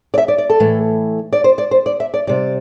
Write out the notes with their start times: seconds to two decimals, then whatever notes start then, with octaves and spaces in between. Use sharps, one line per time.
0.14 D5
0.18 E5
0.28 D5
0.38 D5
0.50 A4
0.60 A2 E3 A3
1.33 D5
1.44 C5
1.58 D5
1.71 C5
1.86 D5
2.00 E5
2.14 D5
2.27 C3 G3 D5